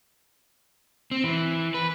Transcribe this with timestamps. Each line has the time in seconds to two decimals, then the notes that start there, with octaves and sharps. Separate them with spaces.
1.11 C4
1.24 E3
1.74 B4